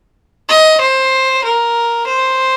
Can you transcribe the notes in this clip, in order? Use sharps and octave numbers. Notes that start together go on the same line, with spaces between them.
D#5
C5
A#4
C5